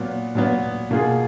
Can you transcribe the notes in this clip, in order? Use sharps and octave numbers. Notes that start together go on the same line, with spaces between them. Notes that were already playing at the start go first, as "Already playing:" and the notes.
Already playing: A#2 F#3 B3
A#2 F#3 B3
B2 A#3 F4 G#4